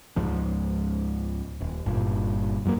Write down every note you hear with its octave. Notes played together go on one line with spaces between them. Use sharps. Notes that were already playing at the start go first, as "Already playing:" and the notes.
C#2 G#2 F3
D#1
G1 G2 A#2
F#2 F#3 A3 A#3